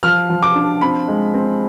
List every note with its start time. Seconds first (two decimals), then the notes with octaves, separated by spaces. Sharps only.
0.03 F3 F6
0.29 F3
0.42 D6
0.55 D4
0.81 C4 B5
1.08 G#3
1.34 C4